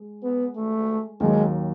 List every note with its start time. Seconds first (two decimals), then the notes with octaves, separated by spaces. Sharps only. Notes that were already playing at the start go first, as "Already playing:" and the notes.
Already playing: G#3
0.23 B3
0.56 A3
1.20 D#2 D#3 F#3 G#3